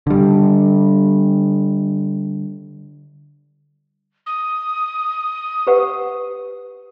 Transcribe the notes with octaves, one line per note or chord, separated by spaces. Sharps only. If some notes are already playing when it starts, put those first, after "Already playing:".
D3 G3
D#6
G4 B4 F#5